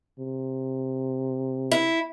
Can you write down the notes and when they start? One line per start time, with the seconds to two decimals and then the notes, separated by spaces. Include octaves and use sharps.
0.19 C3
1.72 E4